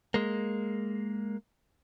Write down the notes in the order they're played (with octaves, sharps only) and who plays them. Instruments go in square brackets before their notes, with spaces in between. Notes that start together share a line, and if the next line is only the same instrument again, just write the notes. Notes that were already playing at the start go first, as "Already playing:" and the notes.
[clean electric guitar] G#3 A#3